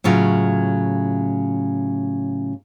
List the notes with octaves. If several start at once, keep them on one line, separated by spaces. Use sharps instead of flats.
A2 C#3 F#3 F4